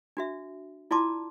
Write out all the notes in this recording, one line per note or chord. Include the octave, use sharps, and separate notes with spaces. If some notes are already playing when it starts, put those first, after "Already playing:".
D4 F#4 E5
E4 F4 D5 A5 C6 D6